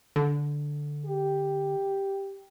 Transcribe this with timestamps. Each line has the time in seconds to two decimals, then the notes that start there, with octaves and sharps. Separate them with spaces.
0.16 D3
1.05 G4